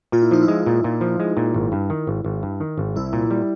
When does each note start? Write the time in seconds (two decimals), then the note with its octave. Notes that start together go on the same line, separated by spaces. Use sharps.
0.12 A#2 F4
0.22 E4
0.31 F3 D#4
0.43 E4
0.48 G#3
0.66 A#2
0.84 A#2
1.01 F3
1.20 G#3
1.37 A#2
1.54 G#1
1.72 G2
1.90 D#3
2.07 G#1
2.25 G#1
2.43 G2
2.60 D#3
2.78 G#1
2.96 C2 E4
3.13 A#2
3.31 G3